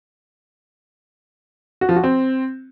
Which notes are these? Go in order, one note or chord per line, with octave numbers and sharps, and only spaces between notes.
F#4
F3
F#4
C4